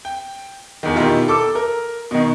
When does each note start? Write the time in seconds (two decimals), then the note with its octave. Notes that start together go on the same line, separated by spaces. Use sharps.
0.05 G5
0.83 E2 D#3
0.95 B2 D#3 E4 F4 G4
1.28 A4 D6 E6
1.55 A#4
2.11 B2 D#3